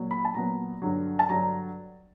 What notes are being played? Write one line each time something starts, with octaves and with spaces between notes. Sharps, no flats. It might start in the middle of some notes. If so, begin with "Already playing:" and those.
Already playing: A#2 F#3
B5
A5
A#2 F#3 B3 A#5
G2 D3 F#3
A5
G2 D3 F#3 A#5